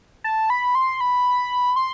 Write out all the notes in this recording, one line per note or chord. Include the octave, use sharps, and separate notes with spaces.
A5
B5
C6
B5
C6